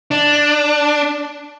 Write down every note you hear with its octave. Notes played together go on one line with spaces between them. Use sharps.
D4